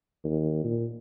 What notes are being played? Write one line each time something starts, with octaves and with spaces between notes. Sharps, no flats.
D#2
A#2